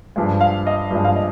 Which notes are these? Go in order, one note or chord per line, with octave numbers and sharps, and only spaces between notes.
G2 F3 G#3
F5
D#5
G2 F3 G#3
F5
D#5